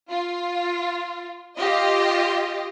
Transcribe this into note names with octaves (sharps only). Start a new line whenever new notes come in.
F4
F4 G4 D#5